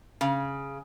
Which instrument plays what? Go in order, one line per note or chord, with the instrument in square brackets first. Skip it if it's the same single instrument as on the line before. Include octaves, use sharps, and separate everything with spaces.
[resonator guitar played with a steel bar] C#3